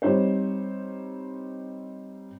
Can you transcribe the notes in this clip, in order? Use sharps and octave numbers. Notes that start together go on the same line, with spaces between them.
G3 C4 D#4 C5 C#5